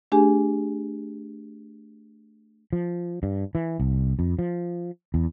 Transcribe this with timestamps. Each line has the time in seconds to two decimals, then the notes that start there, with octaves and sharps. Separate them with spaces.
0.12 A3 D4 G4 G#4 G#5
2.73 F3
3.23 G2
3.55 E3
3.80 C2
4.19 F2
4.39 F3
5.14 E2